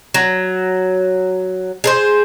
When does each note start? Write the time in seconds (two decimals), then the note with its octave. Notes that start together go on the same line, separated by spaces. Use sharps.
0.14 F#3
1.84 G#4 A#4 C5